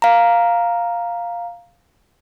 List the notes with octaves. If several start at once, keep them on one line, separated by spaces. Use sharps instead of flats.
F5 A#5